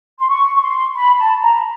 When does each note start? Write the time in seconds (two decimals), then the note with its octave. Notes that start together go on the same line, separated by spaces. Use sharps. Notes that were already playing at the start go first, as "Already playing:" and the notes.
0.19 C6
0.28 C#6
0.55 C#6
0.62 C6
0.96 B5
1.18 A5
1.42 A#5